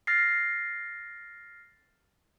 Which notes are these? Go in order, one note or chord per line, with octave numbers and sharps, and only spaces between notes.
F6 A6 A#6 C7